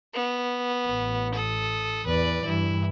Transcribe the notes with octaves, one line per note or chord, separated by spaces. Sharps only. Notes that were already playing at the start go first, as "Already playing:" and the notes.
B3
A1
A4 D#6
E2 E3 B4 D5
G2 E3 E4